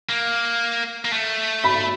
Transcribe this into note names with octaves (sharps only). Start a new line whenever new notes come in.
A#3
A#3
A3
B5 B6